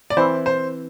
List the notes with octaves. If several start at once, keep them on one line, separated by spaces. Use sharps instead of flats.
D5
E3 C4 E4 C5
C5